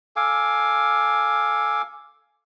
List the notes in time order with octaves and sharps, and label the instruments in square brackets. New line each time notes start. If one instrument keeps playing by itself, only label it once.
[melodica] A4 F5 G#5 D6